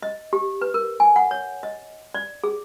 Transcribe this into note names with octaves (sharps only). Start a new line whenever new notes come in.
D#5
G4
B4
A#4
G#5
F#5
C#5
D#5
D5
G#4